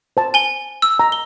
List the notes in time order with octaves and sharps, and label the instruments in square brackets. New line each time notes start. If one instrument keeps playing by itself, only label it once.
[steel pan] C5 A5
[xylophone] G#5 G7
E6
[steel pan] A#5
[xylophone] G7